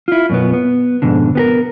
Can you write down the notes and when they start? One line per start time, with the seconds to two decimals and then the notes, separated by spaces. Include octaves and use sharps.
0.08 E4 F4
0.30 F#2 B2 B3
0.53 B3
1.02 F2 G#2 B2 D3
1.35 B3 G4 A#4